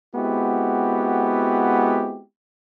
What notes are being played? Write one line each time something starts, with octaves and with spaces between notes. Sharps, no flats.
G#3 B3 C4 E4 F#4 G4